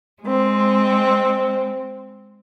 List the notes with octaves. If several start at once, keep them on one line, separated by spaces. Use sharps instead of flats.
G#3 C4